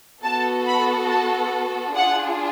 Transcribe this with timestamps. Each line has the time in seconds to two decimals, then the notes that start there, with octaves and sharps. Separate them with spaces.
0.23 B3 F#4 A4 A5
0.67 B5
1.10 A5
1.96 D4 F4 G#4 F#5